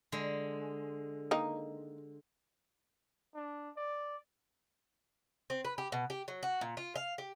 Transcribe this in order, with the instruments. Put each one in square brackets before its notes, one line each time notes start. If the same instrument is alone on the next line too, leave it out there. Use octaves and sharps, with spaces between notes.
[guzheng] D3 G#3
[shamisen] D#3 A#3 D#4
[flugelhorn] D4
D5
[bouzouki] C4
B4
G4
B2
G4
F#3
F#4
A#2
F4
F5
G4